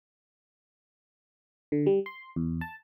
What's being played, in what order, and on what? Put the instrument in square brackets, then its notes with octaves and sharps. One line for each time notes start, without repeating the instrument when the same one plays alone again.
[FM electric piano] D3
G3
C6
E2
A5